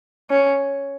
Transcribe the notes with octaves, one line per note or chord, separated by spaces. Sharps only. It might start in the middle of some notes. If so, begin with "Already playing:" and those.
C#4